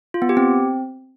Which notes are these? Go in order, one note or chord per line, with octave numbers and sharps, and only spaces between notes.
F4
B3
G4
C4